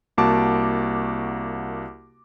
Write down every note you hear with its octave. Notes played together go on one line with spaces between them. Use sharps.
C2 A#3 F#4 A5 D6